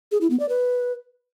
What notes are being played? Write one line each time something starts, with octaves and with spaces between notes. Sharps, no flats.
G#4
E4
B3
D5
B4